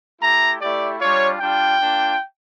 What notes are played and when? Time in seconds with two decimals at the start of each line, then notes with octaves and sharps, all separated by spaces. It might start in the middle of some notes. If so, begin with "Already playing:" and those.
0.22 A3 E4 G4 A#5
0.61 A3 E4 G4 D5
1.00 G3 D4 F4 C#5
1.39 G3 D4 F4 G5
1.79 A#3 D4 F4